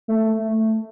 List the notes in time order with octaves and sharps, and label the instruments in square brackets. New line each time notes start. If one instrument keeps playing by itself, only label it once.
[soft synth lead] A3